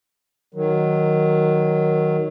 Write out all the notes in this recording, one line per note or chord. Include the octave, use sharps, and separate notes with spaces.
D#3 F#3